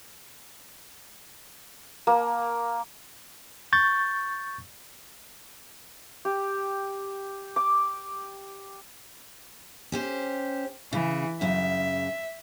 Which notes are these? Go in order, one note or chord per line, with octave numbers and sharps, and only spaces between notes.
A#3
C#6 G6 A6
G4
D6
C#4 G4 C5
C#3 E3
F#2 C#3 E5